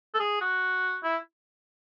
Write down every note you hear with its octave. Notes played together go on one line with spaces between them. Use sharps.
A4
G#4
F#4
E4